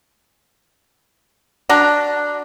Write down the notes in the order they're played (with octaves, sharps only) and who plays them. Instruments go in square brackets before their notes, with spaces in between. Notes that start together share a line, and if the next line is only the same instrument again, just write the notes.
[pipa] D4 F#4 A#5